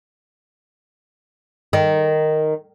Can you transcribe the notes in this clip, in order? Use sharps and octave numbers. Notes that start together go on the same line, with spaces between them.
D#3